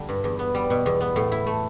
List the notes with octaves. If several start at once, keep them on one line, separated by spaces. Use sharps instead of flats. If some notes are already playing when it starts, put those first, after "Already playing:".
Already playing: D3 G3
G2
E2
B3
G3
B2
E2
B3
A2
E4
A3